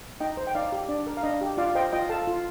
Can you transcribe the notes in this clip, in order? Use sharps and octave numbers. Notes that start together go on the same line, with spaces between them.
D#4 D#5 G5
C5
G5
D#4 D5 F5
G4
D4 D5
A#4
F5
D4 D#5
G4
F4 D5 F5
C5 D#5 G5
F4 D#5 G5
A4 F5 A5
F4